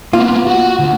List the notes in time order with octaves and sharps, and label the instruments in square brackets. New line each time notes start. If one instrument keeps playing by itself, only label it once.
[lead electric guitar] A#3 B3 [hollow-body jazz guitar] F4
[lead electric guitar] F#4 F#5
D2